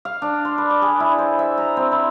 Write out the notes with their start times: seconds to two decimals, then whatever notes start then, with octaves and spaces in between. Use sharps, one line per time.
0.05 F5
0.22 D4
0.45 C6
0.58 B4
0.70 D5
0.82 G#4
1.00 E4
1.18 C5
1.39 E5
1.58 A#5
1.77 C4
1.92 E4